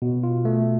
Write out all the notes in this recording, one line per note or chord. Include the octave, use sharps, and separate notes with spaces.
B2
F4
A3